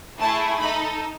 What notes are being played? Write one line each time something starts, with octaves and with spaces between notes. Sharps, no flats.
A3 E4 G#4 A5
D#4 A4 B5